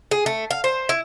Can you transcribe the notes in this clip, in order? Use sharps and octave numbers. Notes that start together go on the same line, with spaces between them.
G#4
A3
F5
C5
E4